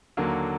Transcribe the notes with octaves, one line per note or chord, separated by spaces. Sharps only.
D#2 D3 F#3 A#3